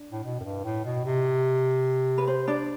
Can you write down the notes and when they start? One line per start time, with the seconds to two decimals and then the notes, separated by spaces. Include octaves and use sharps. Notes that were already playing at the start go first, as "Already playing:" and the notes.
Already playing: D4
0.12 A2
0.23 B2
0.40 F#2
0.44 G2
0.64 A2
0.85 B2
1.05 C3
2.18 B4
2.27 C5
2.48 D4 D5